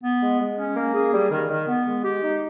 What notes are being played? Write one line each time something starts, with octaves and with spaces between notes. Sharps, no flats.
B3
G#3
G#3
C#4
A#3
G#4
G3
D#3
D#3
B3
G#3
G4
D#4